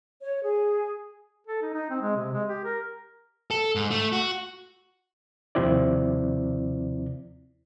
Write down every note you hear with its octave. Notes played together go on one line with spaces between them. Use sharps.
C#5
G#4
A4
D#4
D#4
C4
G#3
C3
G#3
G4
A#4
A4
G#2
A3
F#4
D#2 C3 F3 C4 E4 D5